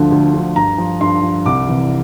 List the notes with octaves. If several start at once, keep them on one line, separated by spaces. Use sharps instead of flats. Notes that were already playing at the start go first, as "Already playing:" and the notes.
Already playing: D2 D3 F3
D2
D3 F3
G2 A#5
F3
G2 C6
F3
C2 D6
C3 E3